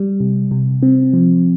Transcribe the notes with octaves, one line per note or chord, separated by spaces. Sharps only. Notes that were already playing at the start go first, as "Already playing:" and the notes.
Already playing: G3
C3
C3
C4
F3